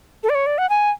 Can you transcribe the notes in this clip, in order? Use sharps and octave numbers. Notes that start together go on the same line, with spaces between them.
A4
D5
C#5
D5
F#5
G#5